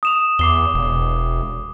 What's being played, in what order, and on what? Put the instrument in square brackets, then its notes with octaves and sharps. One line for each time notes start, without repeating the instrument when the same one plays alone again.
[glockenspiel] D#6 E7 F7
[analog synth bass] E2 [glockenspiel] D6 C7 G7
[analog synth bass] E1